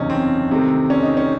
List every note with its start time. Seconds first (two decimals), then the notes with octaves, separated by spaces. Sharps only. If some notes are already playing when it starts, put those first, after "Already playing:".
Already playing: F#1 E2 C3 C#4 D#4
0.10 C4
0.51 C2 C3 D#3 A3
0.90 C#4
1.03 D#4
1.17 C#4